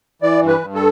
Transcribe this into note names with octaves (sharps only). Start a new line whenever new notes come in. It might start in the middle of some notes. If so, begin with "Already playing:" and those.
E3 D5
G2
B4
G2
A4